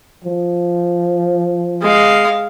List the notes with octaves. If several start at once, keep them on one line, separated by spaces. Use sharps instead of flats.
F3
G#3 F5